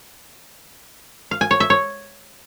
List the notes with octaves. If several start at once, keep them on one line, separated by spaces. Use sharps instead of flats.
F5
G#5
C#5
E5
C#5